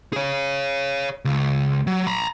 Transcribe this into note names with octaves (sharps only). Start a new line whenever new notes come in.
G#4 C#5
C#2
F#3
A#5 B5